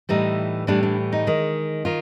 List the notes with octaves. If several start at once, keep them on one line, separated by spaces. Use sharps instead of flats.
A2 E3 G3 D#4
A2 E3 G3 D4
D4
D#4
D#3 G#3
D#3 F4